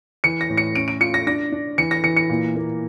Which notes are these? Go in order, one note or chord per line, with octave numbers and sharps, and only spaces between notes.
E3 C#7
A#6
A2
C#7
C#4 D7
D7
F4 C#7
A#6
D4 A#6
D4
E3 C#7
A#6
E3 C#7
C#7
A#2
A#3